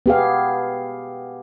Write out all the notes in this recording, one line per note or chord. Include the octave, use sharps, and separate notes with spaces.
B3 G4 G#4 F5